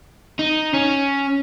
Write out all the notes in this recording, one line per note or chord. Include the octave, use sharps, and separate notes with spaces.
D#4
C#4